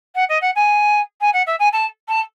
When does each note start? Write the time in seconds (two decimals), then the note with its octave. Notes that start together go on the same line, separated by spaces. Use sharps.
0.15 F#5
0.29 D#5
0.41 F#5
0.55 G#5
1.21 G#5
1.33 F#5
1.46 E5
1.59 G#5
1.73 A5
2.08 A5